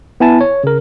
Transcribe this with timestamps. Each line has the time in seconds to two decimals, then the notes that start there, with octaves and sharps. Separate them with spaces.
0.20 B3 E4 G#5 A5
0.41 C#5
0.64 C#3 A#4